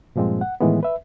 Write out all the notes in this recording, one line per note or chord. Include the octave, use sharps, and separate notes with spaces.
G2 A#2 F3 G#3 C4
F#5
A2 D#3 E3 G#3 B3
B4 E5